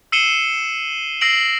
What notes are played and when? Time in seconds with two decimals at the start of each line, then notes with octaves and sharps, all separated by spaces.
0.12 E6 C7 C#7 D#7 E7 G7
1.21 E6 A#6 C7 D7 F#7